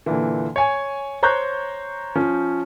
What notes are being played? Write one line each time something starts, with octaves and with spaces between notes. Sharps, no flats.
A#2 D3 E3
C#5 G#5
C5 C#5 A#5 C#6 F#6 G6
F3 C#4